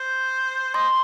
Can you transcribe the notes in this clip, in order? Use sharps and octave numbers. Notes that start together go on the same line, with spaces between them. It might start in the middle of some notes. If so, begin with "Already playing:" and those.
Already playing: C5
D#5 C6